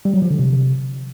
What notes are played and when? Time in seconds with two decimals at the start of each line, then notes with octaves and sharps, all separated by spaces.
0.05 G3
0.14 F#3
0.22 F3
0.30 D3
0.39 C3